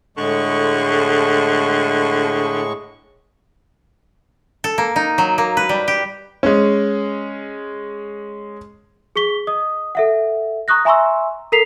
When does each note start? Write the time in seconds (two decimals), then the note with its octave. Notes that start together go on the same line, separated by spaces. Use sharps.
0.17 A2 D3 G#3 C#6
4.64 A4
4.78 A#3
4.96 D#4
5.18 F#3
5.38 A#3
5.57 B4
5.69 G3
5.88 G4
6.43 G#3 C#4
9.16 G#4 C#6 B6 G7
9.47 D#5 D#6
9.95 A4 E5 F#5
10.68 A#5 C#6 D#6 F#6 A#6
10.85 E5 G#5 A#5 C6 C#6 E6
11.52 A4 A#4 A#5 B6 C7 F7